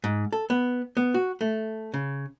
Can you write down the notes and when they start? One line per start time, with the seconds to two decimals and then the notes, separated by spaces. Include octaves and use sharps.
0.04 G#2
0.33 A4
0.50 B3
0.97 B3
1.14 F#4
1.41 A3
1.94 C#3